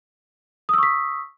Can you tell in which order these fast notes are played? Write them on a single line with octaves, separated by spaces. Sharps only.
D#6 E6 C#6 B6